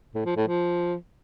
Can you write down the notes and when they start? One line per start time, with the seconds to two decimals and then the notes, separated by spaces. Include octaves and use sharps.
0.15 A2
0.26 F3
0.36 A2
0.47 F3